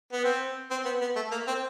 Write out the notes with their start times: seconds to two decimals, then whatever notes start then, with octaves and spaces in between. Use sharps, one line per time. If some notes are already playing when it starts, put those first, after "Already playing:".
0.13 B3
0.24 C4
0.71 C4
0.85 B3
1.01 B3
1.16 A3
1.32 A#3
1.47 C4